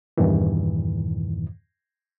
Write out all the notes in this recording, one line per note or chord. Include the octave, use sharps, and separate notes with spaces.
E2 G2 A#2 D#3 E3